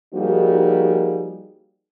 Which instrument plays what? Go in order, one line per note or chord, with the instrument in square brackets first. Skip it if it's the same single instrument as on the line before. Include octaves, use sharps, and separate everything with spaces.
[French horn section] F3 G3 A#3 D#4 F#4 G#4